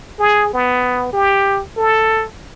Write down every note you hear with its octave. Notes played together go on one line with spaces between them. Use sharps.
G#4
B3
G4
A4